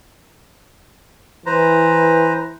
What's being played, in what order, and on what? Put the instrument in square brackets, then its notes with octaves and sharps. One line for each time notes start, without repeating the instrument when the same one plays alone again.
[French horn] E3 [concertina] B4 C5 A#5